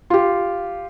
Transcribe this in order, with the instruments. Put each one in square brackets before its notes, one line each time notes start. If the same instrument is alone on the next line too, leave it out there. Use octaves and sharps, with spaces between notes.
[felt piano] F4 G4